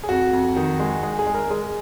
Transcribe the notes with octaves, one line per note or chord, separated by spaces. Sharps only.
G#4
F2 F#4
F2
D#3
G#3
G#3 G#4
G#4
G#3
A#4
G#3 G#4